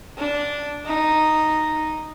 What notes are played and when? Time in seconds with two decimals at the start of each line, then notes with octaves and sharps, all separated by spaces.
0.18 D4
0.87 D#4